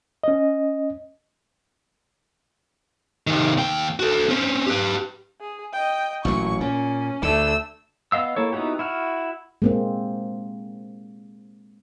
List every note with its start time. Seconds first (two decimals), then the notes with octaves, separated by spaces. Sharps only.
0.24 C#4 D#5
3.27 C3 D#3
3.58 D#2 G5
3.99 F#4 A4
4.29 C4 C#4
4.66 G4 B4
5.41 G#4
5.73 D#5 G5
6.25 A1 A#2 F#3 C#6
6.61 A#2 C#4
7.23 D2 D3 A3 E6
8.12 B3 D#5 F5 E6
8.36 A#3 E4 A4 C#5
8.53 B3 D#4 E4 F#4 G4
8.79 E4 F#4 F6
9.62 G#3 A#3 C4